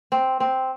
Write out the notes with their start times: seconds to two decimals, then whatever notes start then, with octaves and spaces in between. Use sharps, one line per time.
0.12 C4
0.40 C4